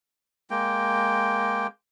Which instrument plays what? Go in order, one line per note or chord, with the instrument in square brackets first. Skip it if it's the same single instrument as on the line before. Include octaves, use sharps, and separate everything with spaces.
[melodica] G#3 A#3 G5